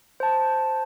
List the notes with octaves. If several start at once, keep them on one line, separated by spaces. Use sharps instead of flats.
C5 A5